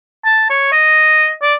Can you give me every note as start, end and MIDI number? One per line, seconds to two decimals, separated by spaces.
0.25 0.46 81
0.50 0.68 73
0.72 1.31 75
1.42 1.54 74